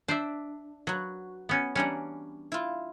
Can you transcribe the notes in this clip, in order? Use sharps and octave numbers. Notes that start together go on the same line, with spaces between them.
D4 C5 D5 E5
F#3 F#4 B4
B3 C#4
E3 G3 C#4 D4 A#5
E4 F4